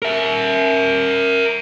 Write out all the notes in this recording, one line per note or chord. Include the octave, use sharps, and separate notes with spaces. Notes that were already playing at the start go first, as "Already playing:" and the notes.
A#4 E5